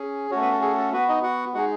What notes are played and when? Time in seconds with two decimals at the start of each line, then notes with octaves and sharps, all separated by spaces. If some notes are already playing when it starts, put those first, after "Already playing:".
Already playing: C#4 G#4
0.31 A3 C#4 F#4 C#5
0.41 B3 B4
0.52 A4
0.62 G#4
0.78 A4
0.92 B3 F#4 B4
1.09 D#4 D#5
1.23 F#4 F#5
1.54 G#3 D#4 F#4 G#4 F#5